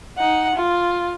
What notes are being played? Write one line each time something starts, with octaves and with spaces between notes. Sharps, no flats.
D#4 F#5
F4